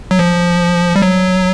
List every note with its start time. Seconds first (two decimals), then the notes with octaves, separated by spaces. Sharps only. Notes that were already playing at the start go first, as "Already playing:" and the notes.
0.11 F#3
0.19 F3
0.96 G3
1.02 F#3